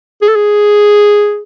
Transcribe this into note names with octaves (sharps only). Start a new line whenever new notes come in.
G#4
A4
G#4